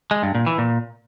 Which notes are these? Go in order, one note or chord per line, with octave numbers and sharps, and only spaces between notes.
G#3
G2
A#2
E3
A#2